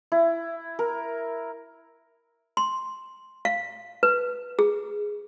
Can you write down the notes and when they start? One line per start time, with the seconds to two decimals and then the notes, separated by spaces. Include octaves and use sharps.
0.12 E4
0.79 A#4
2.57 C6
3.45 F5
4.03 B4
4.59 G#4